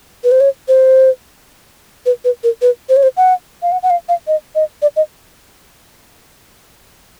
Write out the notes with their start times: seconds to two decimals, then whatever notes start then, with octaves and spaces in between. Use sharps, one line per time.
0.24 B4
0.31 C5
0.40 C#5
0.68 C5
2.06 B4
2.24 B4
2.43 A#4
2.62 B4
2.89 C5
2.97 C#5
3.03 C5
3.17 F#5
3.62 F5
3.72 F#5
3.83 F#5
3.90 F5
4.09 F5
4.27 D#5
4.55 D#5
4.82 D5
4.96 D#5